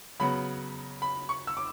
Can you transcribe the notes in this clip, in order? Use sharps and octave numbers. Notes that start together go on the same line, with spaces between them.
C#3 F#3 B3 B5
B5
C#6
E6
D6